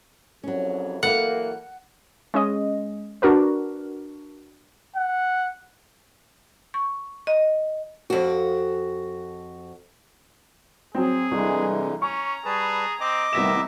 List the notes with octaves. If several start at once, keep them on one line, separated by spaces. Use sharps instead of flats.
C2 F2 F#3 C#4
E3 F#3 A#3 A4 B4 F5 F#5
G#3 C#4 D#5
D4 F#4 A#4 B4
F#5
C#6
D#5
F2 F#4
F#3 C4 G#4
C2 D3 E3 G#3
C#4 A#5 C#6
G3 G#4 B4 A5
C4 D#5 D6
C2 A2 D#3 B3 E5 A#6 E7